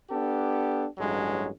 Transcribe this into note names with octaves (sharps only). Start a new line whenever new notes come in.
B3 D4 G4 A4
A1 G2 F#3 G#3